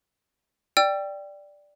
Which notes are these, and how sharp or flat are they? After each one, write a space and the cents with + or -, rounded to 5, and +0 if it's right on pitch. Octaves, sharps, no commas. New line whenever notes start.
D5 +0 G5 +0 E6 +40